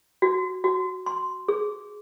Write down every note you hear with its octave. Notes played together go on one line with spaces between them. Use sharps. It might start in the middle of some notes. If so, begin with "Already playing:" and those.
F#4
F#4
C6
G#4